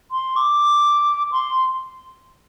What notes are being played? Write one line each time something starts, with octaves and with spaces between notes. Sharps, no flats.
C6
D6
C6